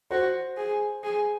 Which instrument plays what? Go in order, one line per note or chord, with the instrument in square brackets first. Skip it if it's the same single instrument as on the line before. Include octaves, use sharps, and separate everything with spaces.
[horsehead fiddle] F#4 [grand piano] C5
[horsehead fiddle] G#4
G#4